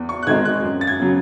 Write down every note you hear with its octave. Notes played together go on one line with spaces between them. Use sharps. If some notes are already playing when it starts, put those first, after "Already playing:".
Already playing: E2
C#6
F#6
D#3 G#3 C4 D#4 G#6
F#6
F#2
A6
G#6
C#3 F#3